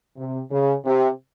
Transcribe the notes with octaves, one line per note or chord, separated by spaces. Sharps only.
C3
C#3
C3